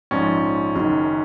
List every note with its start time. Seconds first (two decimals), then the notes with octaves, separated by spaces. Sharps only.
0.11 A#1 G#2 F3 C#4
0.75 F#1 F#2 D#3